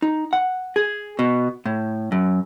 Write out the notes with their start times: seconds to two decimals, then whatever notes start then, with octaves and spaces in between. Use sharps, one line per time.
0.02 D#4
0.33 F#5
0.76 G#4
1.19 B2
1.66 A2
2.12 F#2